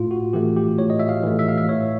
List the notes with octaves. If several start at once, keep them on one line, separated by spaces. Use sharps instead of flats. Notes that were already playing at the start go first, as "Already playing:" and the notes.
Already playing: A2 F4
F#4
E3 A3 G4
G4
A2 C#5
D#5
E5
F5
E3 A3
E5
F5
E5
A2 C#5